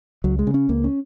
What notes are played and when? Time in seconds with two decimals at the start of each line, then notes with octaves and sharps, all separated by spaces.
0.24 C#2 F#3
0.39 G#3
0.47 C#3
0.54 C#4
0.69 C#2 A#3
0.84 C#4